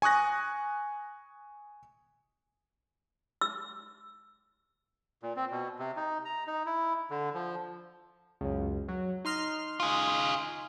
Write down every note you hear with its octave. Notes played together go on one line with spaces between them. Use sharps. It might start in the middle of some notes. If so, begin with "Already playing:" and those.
G#5 C#6 D#6 F#6 A#6
E6
A#2
C4
B2
C3
D#4
A#5
D#4
E4
D3
F3
C#2 F#2
F#3
D#4 C6 F6
F4 G#4